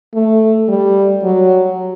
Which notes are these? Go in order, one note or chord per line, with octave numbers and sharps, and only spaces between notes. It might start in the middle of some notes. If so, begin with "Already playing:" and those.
A3
G3
F#3